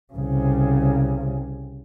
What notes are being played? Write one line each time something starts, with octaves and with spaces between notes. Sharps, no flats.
C2 C#3